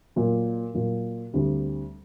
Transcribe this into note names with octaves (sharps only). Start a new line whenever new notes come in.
A#2 F#3 A#3
A#2 F#3 A#3
D2 D3 G3 C4